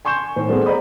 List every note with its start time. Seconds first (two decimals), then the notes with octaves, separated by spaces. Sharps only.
0.05 G#5 C6 C#6 G6 E7
0.36 A2 D#3 C5
0.49 G3 A3 B3 C4 G#4
0.66 C5 D5 D#5 A#5 B5 D#6